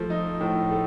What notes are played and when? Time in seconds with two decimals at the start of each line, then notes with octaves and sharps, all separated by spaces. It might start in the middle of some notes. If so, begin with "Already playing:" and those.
Already playing: F3 A3
0.10 D#4
0.40 A2
0.71 A3